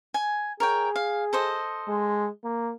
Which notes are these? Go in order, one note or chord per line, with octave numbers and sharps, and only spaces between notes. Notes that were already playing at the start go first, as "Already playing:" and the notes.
G#5
G#4 A#4 C#5 G5
F5
A4 C5 D#5
G#3
A#3